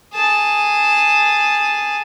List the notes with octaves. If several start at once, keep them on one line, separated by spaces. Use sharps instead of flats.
G#4 A5